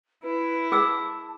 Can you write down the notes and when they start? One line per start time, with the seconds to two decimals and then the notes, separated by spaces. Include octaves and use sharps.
0.23 E4 B4
0.72 G#4 A5 E6